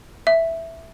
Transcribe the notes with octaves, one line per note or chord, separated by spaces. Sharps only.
E5